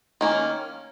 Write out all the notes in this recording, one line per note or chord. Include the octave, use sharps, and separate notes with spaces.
D#3 A#3 C#4